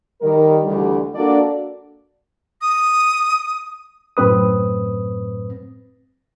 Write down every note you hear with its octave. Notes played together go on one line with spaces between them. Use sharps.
D#3 G3 A#4
D2 D3 E3 G3
A#3 D4 F#4 A4 D5
D#6
F#2 A2 C4 B4 D#6